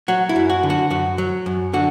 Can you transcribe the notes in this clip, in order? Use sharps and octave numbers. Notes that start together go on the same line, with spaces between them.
F#3 F#4
E4
F#2
F#4
D3
F#4
F#2 F#4
F#3
F#2
D3 F#4